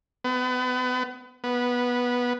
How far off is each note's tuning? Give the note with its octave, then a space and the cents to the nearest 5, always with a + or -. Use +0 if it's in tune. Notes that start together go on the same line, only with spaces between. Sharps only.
B3 +35
B3 -10